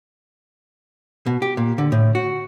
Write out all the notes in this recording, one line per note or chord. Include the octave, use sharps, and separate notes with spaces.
B2
G4
A#2
D3
A2
F#4